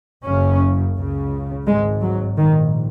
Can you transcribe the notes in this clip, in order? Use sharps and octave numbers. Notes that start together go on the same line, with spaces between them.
F#1 F#2 C#3 C#4
C#2 C#3
G#1 G#2 G#3
F#3
A#1 G#2 D#3